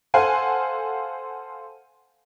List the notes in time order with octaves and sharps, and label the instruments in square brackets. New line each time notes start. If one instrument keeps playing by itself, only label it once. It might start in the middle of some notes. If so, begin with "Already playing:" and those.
[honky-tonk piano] A4 C5 F5 F#5 G#5